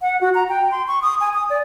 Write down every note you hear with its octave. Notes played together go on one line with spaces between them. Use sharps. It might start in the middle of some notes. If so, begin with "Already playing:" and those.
F#5
F#4
A#5
G5
C6
C#6
D#6
G#5
D#6
D5